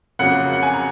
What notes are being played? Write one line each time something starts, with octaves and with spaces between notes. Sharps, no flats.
F2 C#3 F#3 A#3 F#5
F#5
G#5
A#5